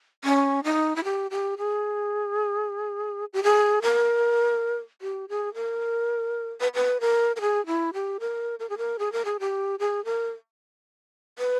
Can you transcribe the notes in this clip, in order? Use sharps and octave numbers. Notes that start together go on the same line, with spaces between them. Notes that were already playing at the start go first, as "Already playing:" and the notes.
C#4
D#4
E4
G4
G4
G#4
G4
G#4
A#4
G4
G#4
A#4
B4
B4
A#4
A#4
G#4
E4
G4
A#4
A#4
G#4
A#4
G#4
A#4
G#4
G4
G#4
A#4
B4